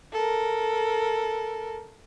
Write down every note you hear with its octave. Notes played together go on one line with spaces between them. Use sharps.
A4 A#4